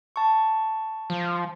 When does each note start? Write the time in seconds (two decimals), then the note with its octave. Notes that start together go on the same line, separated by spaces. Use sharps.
0.16 A5 C#6
1.10 F3